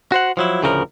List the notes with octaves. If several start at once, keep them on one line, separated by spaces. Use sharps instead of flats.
F#4 C5 F#5
F3 F#3 E4
D2 A2 C#3 F3 A4 A#4